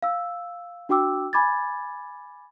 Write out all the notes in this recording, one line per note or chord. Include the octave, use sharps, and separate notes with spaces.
F5 E6
D4 F#4 G5 D6 E6
G#5 B5 D6 G#6 A6